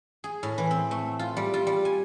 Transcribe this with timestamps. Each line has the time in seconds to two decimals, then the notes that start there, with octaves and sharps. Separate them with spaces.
0.24 G#4
0.43 A2
0.58 E3
0.71 C4
0.91 A3
1.19 F4
1.37 G3
1.54 F4
1.67 G3
1.85 G#5